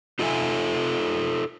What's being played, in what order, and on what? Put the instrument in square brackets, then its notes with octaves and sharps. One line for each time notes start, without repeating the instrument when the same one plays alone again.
[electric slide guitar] D#4 F4 A4 D5 E5 G#5